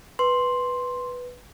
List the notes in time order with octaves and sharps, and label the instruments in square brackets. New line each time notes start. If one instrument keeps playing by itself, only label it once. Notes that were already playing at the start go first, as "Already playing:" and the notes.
[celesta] B4 [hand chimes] C6